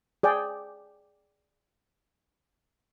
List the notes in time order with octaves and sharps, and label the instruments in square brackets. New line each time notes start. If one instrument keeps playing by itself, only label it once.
[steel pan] G#4 D5 G5